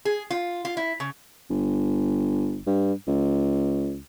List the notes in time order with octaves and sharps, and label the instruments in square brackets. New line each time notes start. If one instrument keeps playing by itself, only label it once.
[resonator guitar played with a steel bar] G#4
F4
F4
E4
C#3
[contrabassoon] G1
G2
C#2